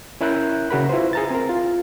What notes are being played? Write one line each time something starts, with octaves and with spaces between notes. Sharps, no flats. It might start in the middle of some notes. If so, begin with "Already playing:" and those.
C#4 E4 A#4 F#6 G6
C#3 F#4 A#4 B5
E4 F4 B4 C5
G#4 A#5 A6
C4 A#4
F4